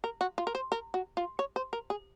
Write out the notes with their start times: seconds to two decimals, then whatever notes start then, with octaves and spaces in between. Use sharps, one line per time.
0.04 A#4
0.21 F#4
0.38 F4
0.47 A#4
0.55 C5
0.72 A#4
0.94 F#4
1.17 F4
1.39 C#5
1.56 C5
1.73 A#4
1.90 G#4